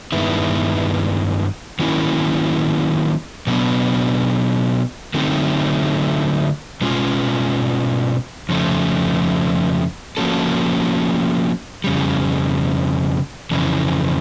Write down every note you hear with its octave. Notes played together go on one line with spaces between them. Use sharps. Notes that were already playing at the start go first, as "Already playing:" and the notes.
G2 D#3 G#3 B3 E4
D#3 F#3 A#3 C#4 E4
B2 F#3 B3 D4
D3 F#3 A3 C4 D#4
B2 G#3 C#4 F4
F2 C#3 F3 A3
F3 A#3 C#4 F#4 A4
F2 C#3 G3
F2 C#3 E3